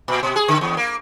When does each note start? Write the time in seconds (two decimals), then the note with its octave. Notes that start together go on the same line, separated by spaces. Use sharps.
0.08 A#2
0.23 B2
0.36 G#4
0.48 D3
0.61 E2
0.77 A#3